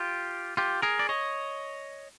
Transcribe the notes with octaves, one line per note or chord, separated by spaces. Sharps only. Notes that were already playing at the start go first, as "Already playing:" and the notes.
Already playing: F4 G4
F4 G4
G#4 A#4
D5
C#5 D#5